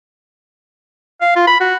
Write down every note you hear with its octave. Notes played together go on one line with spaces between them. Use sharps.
F5
F4
B5
F#4